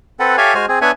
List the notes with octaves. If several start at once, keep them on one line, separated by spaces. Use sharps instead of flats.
C4 A4 B4 F#5
G4 A4 C#5 E5 F5 G#5
G#3 F#4 C5 G#5 F6
C4 G#4
B3 D4 C#5 E5 F#5 G#5